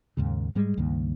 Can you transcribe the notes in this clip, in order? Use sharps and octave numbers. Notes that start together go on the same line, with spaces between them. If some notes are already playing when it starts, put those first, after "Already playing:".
D#2 G#2 C#3
G#2 G3 G#3
C#2 G2 D#3 A#3